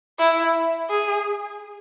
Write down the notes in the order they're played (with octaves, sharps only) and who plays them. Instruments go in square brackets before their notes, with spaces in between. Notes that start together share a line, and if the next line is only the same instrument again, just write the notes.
[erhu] E4
G#4